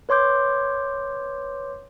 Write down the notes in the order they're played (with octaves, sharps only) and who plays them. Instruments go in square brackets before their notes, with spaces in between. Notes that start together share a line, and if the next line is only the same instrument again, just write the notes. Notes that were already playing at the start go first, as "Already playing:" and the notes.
[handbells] B4 C#5 C6 D6 G6